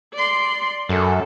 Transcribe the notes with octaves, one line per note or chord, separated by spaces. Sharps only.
D5 C6
F#2 A4